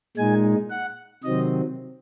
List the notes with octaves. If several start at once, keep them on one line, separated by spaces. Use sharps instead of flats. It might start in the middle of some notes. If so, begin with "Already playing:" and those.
A#2 G#3 D#4 G#5
F#5
C3 D#3 F#3 C4 D#5